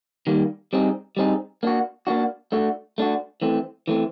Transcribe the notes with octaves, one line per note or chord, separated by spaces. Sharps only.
D#3 G3 A#3
G3 C4 D#4 G#4
G3 C4 D#4 G#4
A#3 D4 F#4
A#3 D4 F#4
A3 D4 F#4
A3 D4 F#4
E3 A3 C4
E3 A3 C4